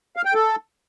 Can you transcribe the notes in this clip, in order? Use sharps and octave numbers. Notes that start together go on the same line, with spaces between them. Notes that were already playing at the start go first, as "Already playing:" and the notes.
F5
G5
A4